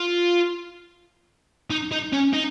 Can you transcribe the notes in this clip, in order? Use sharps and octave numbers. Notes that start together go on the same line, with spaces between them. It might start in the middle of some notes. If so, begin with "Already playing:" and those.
Already playing: F4
D#4
D#4
C#4
D#4